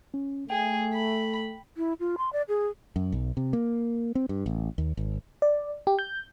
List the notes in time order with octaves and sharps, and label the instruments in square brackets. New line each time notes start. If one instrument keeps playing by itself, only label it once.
[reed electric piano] C#4
[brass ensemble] A3 [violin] G#4 [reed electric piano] G5
[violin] B5
[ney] E4
F4
C6
D5
G#4
[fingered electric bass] F#2
B1
C3
A#3
C4
G2
A1
D#2
G#1
[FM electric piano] D5
G4
G6